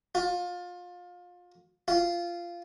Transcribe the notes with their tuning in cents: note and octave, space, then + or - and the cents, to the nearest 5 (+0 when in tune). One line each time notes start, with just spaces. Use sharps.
F4 +25
F4 -15